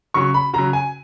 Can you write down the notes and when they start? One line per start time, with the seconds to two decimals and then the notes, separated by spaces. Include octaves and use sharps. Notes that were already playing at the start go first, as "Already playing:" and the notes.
0.14 C#3 F#3 C#6
0.34 B5
0.53 C#3 F#3 A#5
0.73 G#5